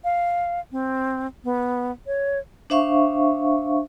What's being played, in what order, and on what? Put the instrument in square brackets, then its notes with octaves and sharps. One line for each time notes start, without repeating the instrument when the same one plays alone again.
[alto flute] F5
C4
B3
C#5
[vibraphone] D4 C5 E5 F5 C#6